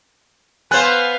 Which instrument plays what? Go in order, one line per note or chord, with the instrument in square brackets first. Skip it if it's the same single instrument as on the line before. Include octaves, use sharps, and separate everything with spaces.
[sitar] B3 C5 [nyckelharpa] B4 F5 [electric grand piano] G#5 F#6